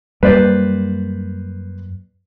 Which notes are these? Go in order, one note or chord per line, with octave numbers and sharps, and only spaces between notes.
F#2 G3 A#3 B4 C5 D5